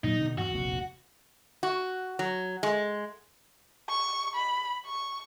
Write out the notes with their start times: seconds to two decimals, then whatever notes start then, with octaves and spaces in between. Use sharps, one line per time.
0.04 A#2 F#3 D#4
0.20 B2 D3 B3
0.38 E2 G2 F#4
0.54 F1 A#1 E2
1.63 F#4
2.19 F#3
2.63 G#3
3.90 C#6
4.35 B5
4.86 C#6